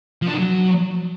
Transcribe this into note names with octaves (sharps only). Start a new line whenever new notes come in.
F3
D4
D#3
F#3